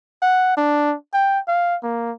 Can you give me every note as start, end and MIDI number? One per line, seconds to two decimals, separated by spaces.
0.22 0.54 78
0.57 0.95 62
1.13 1.39 79
1.48 1.76 77
1.83 2.12 58